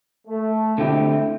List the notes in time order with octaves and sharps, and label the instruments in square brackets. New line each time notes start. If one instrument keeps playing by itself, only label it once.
[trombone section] A3
[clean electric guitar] D3 A3 C4 G4 [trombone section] E4